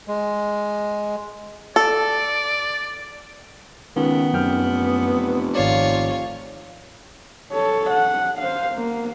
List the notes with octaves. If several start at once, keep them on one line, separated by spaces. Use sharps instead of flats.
G#3
A4 D5
C#2 D#3 B3
F1 F#2 G5 F6
G#1 F4 C#5 D5
A4 C#5
F#5
C5 F5
A#3